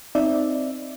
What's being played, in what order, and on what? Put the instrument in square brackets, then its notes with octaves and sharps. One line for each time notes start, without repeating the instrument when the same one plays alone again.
[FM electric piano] C4 D#4 D5 E5